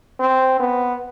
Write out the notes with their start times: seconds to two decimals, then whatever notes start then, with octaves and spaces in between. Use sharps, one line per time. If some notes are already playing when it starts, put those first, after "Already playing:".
0.20 C4
0.60 B3